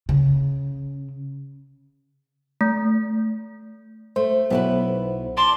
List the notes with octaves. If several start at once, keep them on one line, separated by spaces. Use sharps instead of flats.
C#3
A3
A3 C5
B1 B3 E4 B4
D5 A5 C6